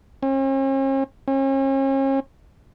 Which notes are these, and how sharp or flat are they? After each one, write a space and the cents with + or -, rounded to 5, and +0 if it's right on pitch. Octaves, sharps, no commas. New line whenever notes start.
C#4 -45
C#4 -40